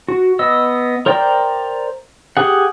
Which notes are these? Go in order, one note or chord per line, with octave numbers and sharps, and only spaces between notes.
F#4
B3 D#5 E6
A#4 C5 D5 G5 A#5
G4 G#4 F#5